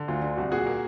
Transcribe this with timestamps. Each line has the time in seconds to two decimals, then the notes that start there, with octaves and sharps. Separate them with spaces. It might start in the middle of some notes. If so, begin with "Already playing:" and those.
Already playing: D3
0.08 D2 F4
0.22 D3
0.37 C2 F#4
0.52 A#2 F#4 G#4
0.66 A#3